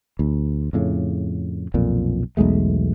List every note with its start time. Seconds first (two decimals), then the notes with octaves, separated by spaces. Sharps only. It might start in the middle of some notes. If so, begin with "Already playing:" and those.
0.19 D2
0.73 F2 A2 C#3
1.74 B1 F2 A#2
2.37 B1 E2 G#3 A3